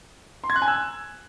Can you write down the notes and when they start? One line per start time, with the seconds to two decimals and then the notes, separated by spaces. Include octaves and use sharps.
0.44 C6
0.50 G#6
0.56 F#6
0.62 G#5
0.68 E6